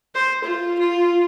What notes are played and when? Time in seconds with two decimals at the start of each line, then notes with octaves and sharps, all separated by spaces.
0.15 C5
0.44 F4
0.79 F4